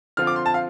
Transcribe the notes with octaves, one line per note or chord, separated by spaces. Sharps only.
D3 F3 C4 F4 F6
D6
C6
A5
F5